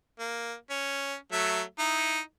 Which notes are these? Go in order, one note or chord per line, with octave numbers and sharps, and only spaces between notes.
A#3
C#4
F#3 A3 E5
D#4 E4